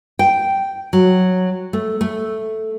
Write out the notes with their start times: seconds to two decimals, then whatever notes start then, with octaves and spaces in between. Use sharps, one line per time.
0.19 G5
0.93 F#3
1.73 A3
2.01 A3